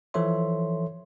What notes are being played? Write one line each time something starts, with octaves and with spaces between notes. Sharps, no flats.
E3 F3 A4 C#5 E5 C6